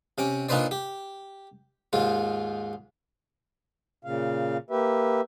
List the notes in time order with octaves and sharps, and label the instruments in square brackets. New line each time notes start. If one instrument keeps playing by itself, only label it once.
[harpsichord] C3 C#4 D6
A#2 D4 D#4 B4 C5 D5
G4
D#2 G#2 F4
[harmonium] A#2 C#3 F5
A#3 G4 B4 E5